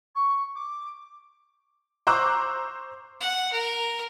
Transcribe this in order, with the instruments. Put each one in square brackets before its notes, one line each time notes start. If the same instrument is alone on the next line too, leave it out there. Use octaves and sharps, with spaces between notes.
[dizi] C#6
D6
[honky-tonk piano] C5 A#5 C#6 D6 E6 F#6
[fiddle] F#5
A#4